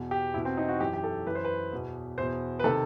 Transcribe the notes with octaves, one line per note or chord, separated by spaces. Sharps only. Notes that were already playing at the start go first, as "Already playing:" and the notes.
Already playing: E2 B2
G4
E2 B2 E4
C4
D#4
F#4
F#2 E3 G4
G4
A4
F#2 E3 B4
C5
B4
E2 B2
E2 B2 C5
B4
C3 D#3 A4